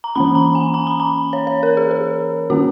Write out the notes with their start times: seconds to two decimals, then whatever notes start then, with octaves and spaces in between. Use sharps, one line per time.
0.04 A#5
0.15 E3 A#3 C#4 B5
0.35 A#5
0.55 G#5
0.74 A#5
0.87 B5
1.00 A#5
1.33 C#5
1.47 C#5
1.63 A#4
1.77 G#4
1.91 G#4
2.50 D#3 A#3 C#4 F#4